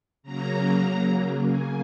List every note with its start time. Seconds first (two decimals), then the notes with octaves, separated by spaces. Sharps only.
0.23 C#3 F#3 A#3 A#5
1.45 C#3 A#3 G#5